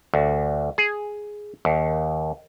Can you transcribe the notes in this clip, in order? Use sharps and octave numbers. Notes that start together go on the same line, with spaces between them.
D2
G#4
D#2